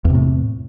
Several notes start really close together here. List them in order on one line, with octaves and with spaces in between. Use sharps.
E2 C3 A2